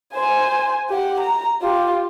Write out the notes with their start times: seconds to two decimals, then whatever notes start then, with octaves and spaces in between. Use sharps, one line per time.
0.14 C5 G#5
0.90 G4 F#5
1.19 A#5
1.62 F4 G4